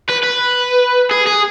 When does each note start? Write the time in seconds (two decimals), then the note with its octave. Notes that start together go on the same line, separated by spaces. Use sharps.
0.09 B4
0.23 B4
1.11 G#4
1.26 G#4